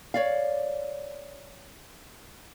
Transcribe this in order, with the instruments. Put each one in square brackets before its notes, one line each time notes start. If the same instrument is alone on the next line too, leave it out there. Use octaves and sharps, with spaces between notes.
[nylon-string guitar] C#5 D5 F5